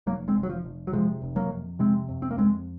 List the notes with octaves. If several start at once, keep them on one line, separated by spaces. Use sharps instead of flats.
F1 F#3 A#3
G#3 C4
F1
F#3
F3
F1
F#3
C3 F3 G#3
F1
F#3 A#3
F2
C3 G#3 C4
F2
C4
A#3
F2 G#3 C4